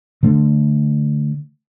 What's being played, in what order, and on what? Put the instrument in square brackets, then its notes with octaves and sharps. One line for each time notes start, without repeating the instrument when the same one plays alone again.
[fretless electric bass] D3 A3 D4